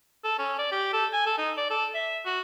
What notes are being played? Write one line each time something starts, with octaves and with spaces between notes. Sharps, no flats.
A4
C#4
D5
G4
A4
G#5
A4
D#4
D5
A4
E5
F#4